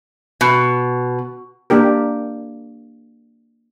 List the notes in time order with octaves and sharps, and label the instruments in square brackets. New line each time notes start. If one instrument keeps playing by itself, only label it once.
[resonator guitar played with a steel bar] B2
[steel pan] A#3 D4 G4 A#4